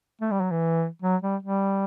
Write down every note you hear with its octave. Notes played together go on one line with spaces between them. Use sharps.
A3
G3
F#3
E3
F#3
G3
G3